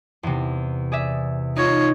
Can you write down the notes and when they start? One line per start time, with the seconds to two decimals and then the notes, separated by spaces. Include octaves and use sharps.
0.23 E2 C3
0.92 G#4 D5 E5
1.56 D#4 F4 C#5